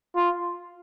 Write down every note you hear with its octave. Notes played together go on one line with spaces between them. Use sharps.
F4